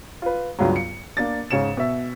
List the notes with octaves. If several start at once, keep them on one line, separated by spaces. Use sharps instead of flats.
F4 B4
C#2 G2 C#3 F#3
C#7
A#3 D4 A6
G#2 C#3 C#5 C#7 E7
B2 E5